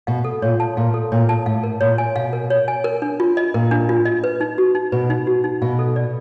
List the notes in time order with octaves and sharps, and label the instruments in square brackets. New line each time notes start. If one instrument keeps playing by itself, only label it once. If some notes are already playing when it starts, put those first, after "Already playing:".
[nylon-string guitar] B2 [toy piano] F5
[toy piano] A4
[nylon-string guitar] A#2 [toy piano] C#5
[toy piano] A5
[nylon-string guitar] A#2 [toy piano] F5
[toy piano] A4
[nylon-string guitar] A#2 [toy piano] C#5
[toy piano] A5
[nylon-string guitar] A2 [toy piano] F5
[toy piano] A#4
[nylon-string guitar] A#2 [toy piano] C#5
[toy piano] G#5
[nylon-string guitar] B2 [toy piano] F5
[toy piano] A#4
C#5
G#5
A#4
D4
F4
D#5
[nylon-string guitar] A#2 [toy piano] A#4
[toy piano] D4
F4
D#5
B4
D#4
F#4
D#4
[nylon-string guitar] B2 [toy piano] B4
[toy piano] D#4
F#4
D#4
[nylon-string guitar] B2 [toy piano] F5
[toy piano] A4
D5